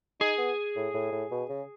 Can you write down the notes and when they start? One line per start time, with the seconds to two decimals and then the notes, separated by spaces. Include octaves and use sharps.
0.20 D#4 G#4
0.38 B3
0.76 A2
0.94 A2
1.12 A2
1.31 B2
1.49 C#3